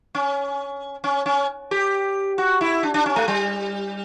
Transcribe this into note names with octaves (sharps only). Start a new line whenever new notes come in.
C#4
C#4
C#4
G4
F#4
E4
D4
D4
C#4
A3
G3